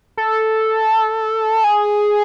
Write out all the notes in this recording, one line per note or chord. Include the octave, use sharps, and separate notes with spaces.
A4
G#4